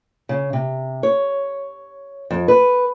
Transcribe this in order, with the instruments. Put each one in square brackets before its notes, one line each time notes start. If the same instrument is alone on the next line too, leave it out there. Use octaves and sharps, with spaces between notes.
[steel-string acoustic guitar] C#3
C3
C#5
F2
B4